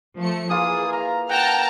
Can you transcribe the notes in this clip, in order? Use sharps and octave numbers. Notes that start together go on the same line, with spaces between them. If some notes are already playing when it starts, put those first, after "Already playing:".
F3 A3 C#7
E3 A#3 F4 G#4 D#6
F5 A#5
F#5 G5 A5 A#5 F6